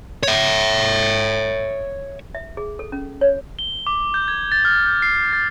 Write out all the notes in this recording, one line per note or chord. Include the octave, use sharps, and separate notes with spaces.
C#5 E5
E5
G#4
A4
C#4
C#5
G7
D6
G6
G#6
A6
F6
G6
C7
A6